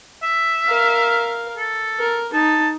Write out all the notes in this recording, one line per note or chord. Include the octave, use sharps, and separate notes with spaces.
E5
A#4 F5
A4
A#4
D#4 A5